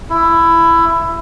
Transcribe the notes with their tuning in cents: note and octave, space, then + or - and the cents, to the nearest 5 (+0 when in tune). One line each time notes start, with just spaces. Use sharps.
E4 +15